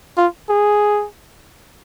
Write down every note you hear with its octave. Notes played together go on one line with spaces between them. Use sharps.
F4
G#4